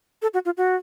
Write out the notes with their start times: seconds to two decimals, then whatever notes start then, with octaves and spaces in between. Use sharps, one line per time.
0.22 A4
0.34 F#4
0.45 F4
0.57 F#4